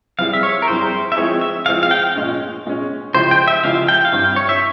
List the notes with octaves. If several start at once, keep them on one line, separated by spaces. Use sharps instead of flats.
G3 C4 E4 G#4 F5
E5
C#5
A#4
G3 C4 E4 G#4 C5
E5
F3 G#3 C4 E4 G#4 C#5
E5
F3 G#3 C4 E4 G#4 F5
F5
G5
F5
A#2 G#3 C#4
A#2 G#3 C#4
C#3 F3 G#3 E4 G4 C5
G5
E5
C#3 F3 G#3 E4 G4 F5
G5
F5
G2 G3 C4 E4 G5
C#5
E5